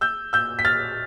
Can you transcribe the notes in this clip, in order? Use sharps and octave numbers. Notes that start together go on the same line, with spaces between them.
E6 G6
E6 G6
B6
F6 A6